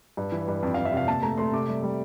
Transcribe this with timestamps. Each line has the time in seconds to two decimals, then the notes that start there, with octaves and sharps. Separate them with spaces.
0.17 G2
0.32 E3
0.48 G2
0.63 F2
0.74 F5
0.78 F2
0.85 E5
0.92 C3 F5
1.08 A#2 A5
1.23 A3 A#5
1.38 A3 C6
1.53 C3 D6
1.69 G3
1.83 G3